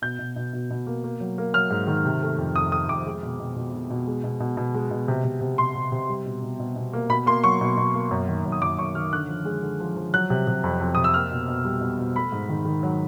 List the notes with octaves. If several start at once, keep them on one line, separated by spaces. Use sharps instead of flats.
B2 G6
B2
B2
B2
B2
A#3
A#3
F#3
A#3
F#3 F6
G#2
D#3
C3
A3
F2
F2 D#6
A3 D#6
F2 D6
G#3
B2
B2
B2
B2
B2
G#3
B2
B2
B2
G#3
B2
C3
C3
C3
C3 C6
C3
C3
G3
B2
B2
B2
B2
A#3
B2 B5
A#3 C6
F#3 C#6
B2
B2
A#3
F#2
D#3
F#2
D#6
F#2 D6
F#2 C#6
D#3 F6
D3 F#6
F3
G#3
D3
F3
F3
F#3 F#6
C3
C3
F2
F2
C3 D#6
E6
A#3 F6
B2
B2
G3
B2
B2
A3 B5
G#2
D#3
D#3
F#3